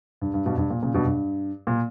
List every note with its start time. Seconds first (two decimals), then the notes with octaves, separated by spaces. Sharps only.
0.22 G2
0.34 G2
0.46 G2 B2
0.58 G2
0.70 A#2
0.82 A#2 C#3
0.94 G2 B2
1.06 G2
1.67 A#2